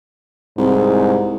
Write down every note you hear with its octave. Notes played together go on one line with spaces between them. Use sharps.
C2 G#2